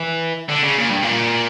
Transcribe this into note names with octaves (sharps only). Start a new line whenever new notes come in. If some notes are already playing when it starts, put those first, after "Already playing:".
Already playing: E3
D3
C#3
A#2
G2
A#2